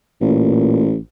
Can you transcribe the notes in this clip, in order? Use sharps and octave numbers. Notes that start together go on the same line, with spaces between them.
A1 A#2